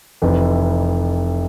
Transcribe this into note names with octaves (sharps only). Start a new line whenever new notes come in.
F1 F2 E3